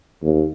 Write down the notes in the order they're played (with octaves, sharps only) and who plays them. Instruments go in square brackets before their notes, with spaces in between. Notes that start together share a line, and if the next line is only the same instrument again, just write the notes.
[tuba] D#2